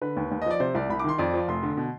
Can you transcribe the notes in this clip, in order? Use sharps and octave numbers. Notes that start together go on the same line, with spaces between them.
D3 B4
D#2
D#2
D#5
F3 D5
C3 C5
C2 D5
C2 B5
D6
D#3 C6
F2 D5
F3
F1 C6
D3
B2